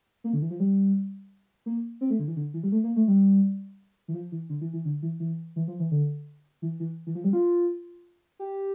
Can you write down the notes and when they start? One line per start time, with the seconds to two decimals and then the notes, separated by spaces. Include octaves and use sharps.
0.24 A#3
0.33 D3
0.42 E3
0.51 F3
0.60 G3
1.66 A#3
2.01 C4
2.10 A3
2.19 D3
2.28 E3
2.37 D3
2.54 E3
2.63 G3
2.72 A3
2.84 A#3
2.96 A3
3.08 G3
4.08 E3
4.14 F3
4.32 E3
4.50 D3
4.61 E3
4.73 E3
4.85 D3
5.03 E3
5.20 E3
5.56 E3
5.68 F3
5.80 E3
5.91 D3
6.62 E3
6.80 E3
7.07 E3
7.15 F3
7.24 G3
7.33 F4
8.39 G4